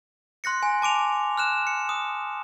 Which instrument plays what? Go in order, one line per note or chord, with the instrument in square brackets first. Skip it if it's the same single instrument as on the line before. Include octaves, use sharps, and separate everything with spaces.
[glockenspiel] C6 F#6 A#6 C#7
G#5
A5 D6 D7 F7
F6 F#6 E7
C#7
D#6